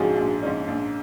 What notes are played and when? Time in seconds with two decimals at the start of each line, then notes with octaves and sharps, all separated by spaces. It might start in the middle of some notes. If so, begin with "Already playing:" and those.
Already playing: A#1 G#2 F3 G#3 C#4 F#4 G#4
0.17 A#1
0.42 G#2 F3 G#3 C#4
0.68 A#1